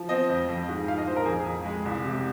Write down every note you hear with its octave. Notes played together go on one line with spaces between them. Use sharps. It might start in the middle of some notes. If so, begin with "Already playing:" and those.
Already playing: F3
C4 D#5
F2
F2
G#2
F3 F5
D#5
A#1 C5
A#4
F2 G#4
F2
G#3
C2
C3